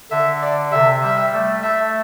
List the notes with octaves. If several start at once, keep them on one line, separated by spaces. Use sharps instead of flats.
D3 E5
D5
C3 E5
G3 E5
A3
A3 E5